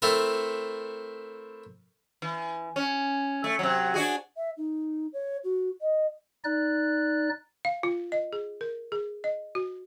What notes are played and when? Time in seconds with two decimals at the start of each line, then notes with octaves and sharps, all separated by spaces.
0.02 A3 C4 E4 A4 A#4
2.22 E3
2.76 C#4
3.44 A3
3.59 C3 F#3
3.94 D4 F#4 G#4
4.37 E5
4.57 D#4
5.13 C#5
5.44 F#4
5.81 D#5
6.44 D#4 D5 F#6
7.65 F5
7.83 F4
8.12 D#5
8.33 G#4
8.61 A#4
8.92 G#4
9.24 D#5
9.55 F#4